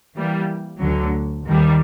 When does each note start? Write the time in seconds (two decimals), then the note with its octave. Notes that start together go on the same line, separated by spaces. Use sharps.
0.16 E3 G3 A#3
0.81 D2 D3 F#3
1.47 D#2 D#3 G3